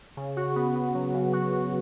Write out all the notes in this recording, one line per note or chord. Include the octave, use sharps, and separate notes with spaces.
C#3
F#4
B3
B3
F#3
C#3
F#4
F#4